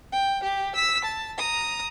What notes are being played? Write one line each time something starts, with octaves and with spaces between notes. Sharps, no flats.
G5
G4
E6 B6
A5
A#5 D#6